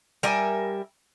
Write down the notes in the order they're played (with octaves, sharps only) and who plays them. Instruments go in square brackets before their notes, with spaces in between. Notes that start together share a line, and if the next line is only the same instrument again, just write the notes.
[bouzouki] G3 A#4 E5 G#5